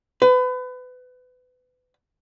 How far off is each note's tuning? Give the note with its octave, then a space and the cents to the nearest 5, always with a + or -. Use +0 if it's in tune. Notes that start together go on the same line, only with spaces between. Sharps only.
B4 +30